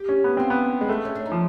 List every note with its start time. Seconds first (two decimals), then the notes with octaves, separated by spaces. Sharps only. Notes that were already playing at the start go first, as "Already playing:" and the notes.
Already playing: G4
0.09 C#4
0.24 B3
0.37 C4 F4
0.50 B3
0.81 G#3
0.89 A3
1.05 C#4
1.15 D4
1.26 D#4
1.32 F3